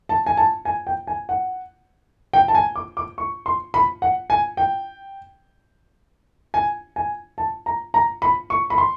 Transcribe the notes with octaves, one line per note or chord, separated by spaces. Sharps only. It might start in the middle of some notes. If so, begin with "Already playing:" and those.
A5
G#5
A5
G#5
G5
G#5
F#5
G5
A5
G#5
D6
D6
C#6
C6
B5
F#5
G#5
G5
G#5
G#5
A5
A#5
A#5
B5
C#6
B5
C6